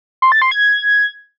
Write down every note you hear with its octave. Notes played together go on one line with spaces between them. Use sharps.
C6
A6
C6
G#6